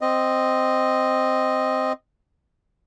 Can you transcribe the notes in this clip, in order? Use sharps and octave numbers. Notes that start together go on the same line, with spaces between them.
C4 D#5